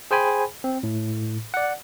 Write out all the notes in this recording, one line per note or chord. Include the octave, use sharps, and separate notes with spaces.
G#4 C5 G5 G#5 B5
C4
A2
D5 F#5